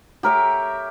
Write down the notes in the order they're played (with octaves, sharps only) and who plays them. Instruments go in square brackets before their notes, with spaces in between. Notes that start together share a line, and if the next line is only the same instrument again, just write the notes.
[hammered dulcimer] G4 A#4 C#5 E5